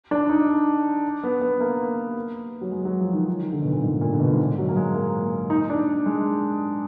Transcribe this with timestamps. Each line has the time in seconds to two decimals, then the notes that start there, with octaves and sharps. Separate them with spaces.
0.11 D4
0.29 D#4
1.23 B3
1.41 B3
1.60 A#3
2.61 F#3
2.71 G#3
2.85 F#3
3.00 F3
3.13 D#3
3.41 D#3
3.52 D3
3.62 B2
3.72 A#2
3.83 G#2
4.01 A#2
4.13 D3
4.20 B2
4.33 G#2
4.38 A#2
4.58 F#3
4.69 A#3
4.76 G#3
4.94 A#3
5.50 D#4
5.70 D4
6.06 G#3